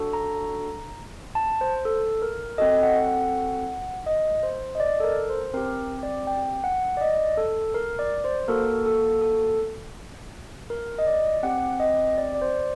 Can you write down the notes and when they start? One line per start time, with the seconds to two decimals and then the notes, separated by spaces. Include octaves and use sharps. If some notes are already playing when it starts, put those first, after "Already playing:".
Already playing: D4 F#4 A4
0.13 A#5
1.35 A5
1.61 C5
1.85 A4
2.22 A#4
2.58 C4 F#4 A4 D#5
2.83 F#5
3.08 F#5
4.06 D#5
4.43 C5
4.75 D#5
4.80 D5
5.00 A4
5.04 A#4
5.30 C5
5.53 C4 G4 A#4
6.03 D5
6.27 G5
6.64 F#5
6.97 D5
7.01 D#5
7.37 A4
7.74 A#4
7.99 D5
8.24 C5
8.48 A#3 F#4 A4 A#4
8.86 A4
9.22 A4
10.70 A#4
10.98 D#5
11.07 D5
11.43 C4 G4 F#5
11.80 D#5
12.18 D5
12.35 D5
12.42 C5